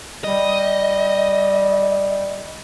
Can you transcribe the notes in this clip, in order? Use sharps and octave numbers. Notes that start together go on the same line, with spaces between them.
G3 D#5